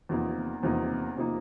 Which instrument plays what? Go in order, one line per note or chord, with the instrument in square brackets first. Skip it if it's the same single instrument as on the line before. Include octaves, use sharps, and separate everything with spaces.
[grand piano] E2 C3 F3 A#3 D#4
E2 C3 F3 A#3 D#4
C3 F3 A#3 D#4